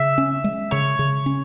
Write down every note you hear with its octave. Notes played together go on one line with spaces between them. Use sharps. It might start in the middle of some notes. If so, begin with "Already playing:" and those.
Already playing: C#3 E5
C#4
G#3
C#3 C#5
C#3
C#4